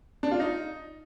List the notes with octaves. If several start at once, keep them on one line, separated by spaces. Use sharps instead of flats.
D4
F4
D#4